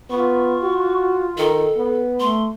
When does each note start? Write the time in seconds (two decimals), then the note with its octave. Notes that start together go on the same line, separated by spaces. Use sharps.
0.10 B3 F4 C#6
0.62 F#4
1.38 D#3 A4
1.76 B3
2.20 A3 C6